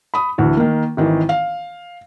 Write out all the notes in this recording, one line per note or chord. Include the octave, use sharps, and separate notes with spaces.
B5 D#6
D2 E3
D#3 A#3
G#1 D#3 E3
F5